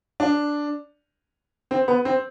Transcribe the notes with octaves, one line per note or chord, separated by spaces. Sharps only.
D4
C4
B3
C4